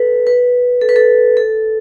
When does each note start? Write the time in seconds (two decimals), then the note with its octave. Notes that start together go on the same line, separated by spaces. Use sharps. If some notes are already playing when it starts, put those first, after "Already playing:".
Already playing: A4 B4
0.27 B4
0.81 A4
0.89 B4
0.96 A4
1.37 A4